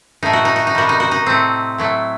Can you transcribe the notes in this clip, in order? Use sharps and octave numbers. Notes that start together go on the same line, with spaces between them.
A2 A3 D#4
F#4
D#4
F#4
D#4
C3 D#3 G3 F#4
D#4
F#4
D#4
A2 A3 C4
A2 F#3 A3